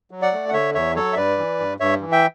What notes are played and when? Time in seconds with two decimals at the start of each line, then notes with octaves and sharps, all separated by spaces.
0.11 F#3
0.22 D5 F#5
0.33 A3
0.49 F#5
0.53 D3 C#5 E5
0.74 E2 C#5 E5
0.96 F#3 A4 C#5
1.13 E5
1.16 G2 B4 D5
1.38 E3
1.60 G2
1.80 G2 C#5 E5
2.01 E3
2.12 E5 G5